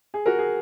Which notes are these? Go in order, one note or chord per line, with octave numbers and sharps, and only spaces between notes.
G#4
F#4 A#4
G#4